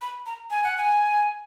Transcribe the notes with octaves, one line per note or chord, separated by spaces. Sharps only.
B5
A#5
G#5
F#5
G#5